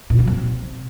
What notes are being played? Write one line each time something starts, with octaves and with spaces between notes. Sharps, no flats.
A#2
F#3
C3